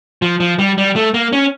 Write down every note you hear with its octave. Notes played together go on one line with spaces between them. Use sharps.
F3
F3
G3
G3
A3
A#3
C#4